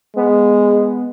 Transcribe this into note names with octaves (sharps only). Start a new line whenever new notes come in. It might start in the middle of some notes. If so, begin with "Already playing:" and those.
G#3 B3